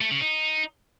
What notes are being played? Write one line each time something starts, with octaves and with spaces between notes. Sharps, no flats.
A3
C#3
D#4